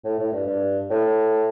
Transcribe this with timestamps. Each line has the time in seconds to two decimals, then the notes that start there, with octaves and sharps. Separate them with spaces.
0.04 A2
0.19 A2
0.32 G2
0.46 G2
0.90 A2